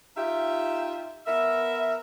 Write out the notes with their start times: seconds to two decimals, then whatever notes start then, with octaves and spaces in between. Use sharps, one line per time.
0.16 D#4 F4 G4 E5
1.25 B3 A#4 E5